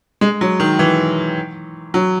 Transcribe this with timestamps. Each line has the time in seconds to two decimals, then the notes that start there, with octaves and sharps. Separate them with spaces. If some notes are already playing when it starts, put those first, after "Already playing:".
0.21 G#3
0.41 F#3
0.60 D#3
0.79 E3
1.94 F#3